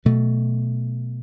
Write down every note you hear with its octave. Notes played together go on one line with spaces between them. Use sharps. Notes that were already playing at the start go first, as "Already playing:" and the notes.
B2 F#3 A3